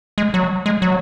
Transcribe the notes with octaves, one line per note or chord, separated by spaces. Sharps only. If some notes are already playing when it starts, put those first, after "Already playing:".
G#3
F#3
G#3
F#3